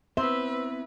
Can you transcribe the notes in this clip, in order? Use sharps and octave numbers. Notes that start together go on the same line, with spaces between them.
B3 C4 E4 B4 C5 E5